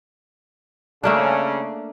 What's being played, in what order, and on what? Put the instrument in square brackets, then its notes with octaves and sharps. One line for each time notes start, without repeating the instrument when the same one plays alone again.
[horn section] C#3 [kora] A3 A#3 D4